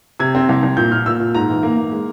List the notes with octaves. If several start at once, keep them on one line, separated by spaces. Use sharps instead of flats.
C3 G#6
C4
C2
C2
A#2 G6
A#2 F6
A#2 E6
A#2
G#2 A#5
E3
A#3
A#3
G#3